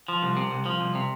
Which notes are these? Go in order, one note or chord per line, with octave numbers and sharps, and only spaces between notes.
F3
C2
C3
C2
F3
C2
C3